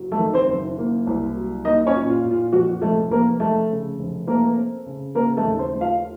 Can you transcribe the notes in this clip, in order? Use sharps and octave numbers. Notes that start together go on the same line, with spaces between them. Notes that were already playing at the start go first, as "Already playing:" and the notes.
Already playing: F#1 F#3
A3 A4
D#3
C4 C5
F#1
A#3
C2
F#3
A#3 D#4 D#5
C#4 C#5
A#2
F4
A#2
F4
F2 F#4
F1 A3 A4
F1 A#3 A#4
F1 A3 A4
C#3
F1
A3 A#3 A#4
C4
C#3
C#3 A#3 A#4
A3 A4
D#2
C4 C5
A3
F4 F5